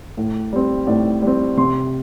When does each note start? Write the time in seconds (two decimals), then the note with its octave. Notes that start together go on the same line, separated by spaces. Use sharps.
0.17 A2
0.53 G3 C4
0.87 A2 D5
1.22 G3 C4
1.57 C3 C6